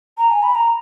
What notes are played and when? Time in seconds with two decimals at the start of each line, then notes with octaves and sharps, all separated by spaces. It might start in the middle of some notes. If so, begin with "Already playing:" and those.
0.18 A#5
0.30 G#5
0.43 B5
0.55 A#5